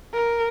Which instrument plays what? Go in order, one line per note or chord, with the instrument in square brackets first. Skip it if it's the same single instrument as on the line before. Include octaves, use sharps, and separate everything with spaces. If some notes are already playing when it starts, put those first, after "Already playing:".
[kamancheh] A#4